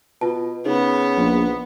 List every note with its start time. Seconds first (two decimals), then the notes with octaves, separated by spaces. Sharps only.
0.21 B2 F4 A5
0.65 C#3 B3 D#4
1.17 A#1